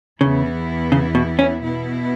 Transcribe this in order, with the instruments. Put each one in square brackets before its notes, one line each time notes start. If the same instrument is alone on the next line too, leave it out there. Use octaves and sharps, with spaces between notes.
[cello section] E2 E3 B3 E4 [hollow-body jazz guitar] C#3
[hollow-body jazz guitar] C#3
B2
C#4
[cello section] B2 B3 E4